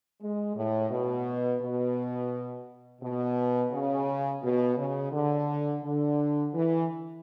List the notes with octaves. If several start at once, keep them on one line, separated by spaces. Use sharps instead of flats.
G#3
A2
B2
B2
B2
C#3
B2
C#3
D3
D3
E3